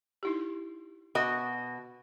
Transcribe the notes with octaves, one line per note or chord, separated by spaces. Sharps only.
D#4 E4 G4
B2 F#4 D#5